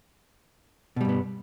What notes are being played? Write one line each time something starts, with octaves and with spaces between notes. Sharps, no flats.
G2 B2 G3 B3